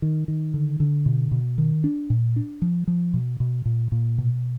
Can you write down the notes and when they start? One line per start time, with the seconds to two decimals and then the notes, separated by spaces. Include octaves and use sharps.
0.02 D#3
0.28 D#3
0.54 D3
0.80 D3
1.06 B2
1.31 B2
1.58 D#3
1.84 D4
2.10 A#2
2.36 D4
2.62 F3
2.87 F3
3.14 B2
3.40 B2
3.65 A#2
3.92 A#2
4.18 B2